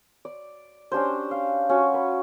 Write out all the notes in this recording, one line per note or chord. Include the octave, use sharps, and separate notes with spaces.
D5
C#4 D4 G4 C5
F5
C#4 F#4 C#6
B4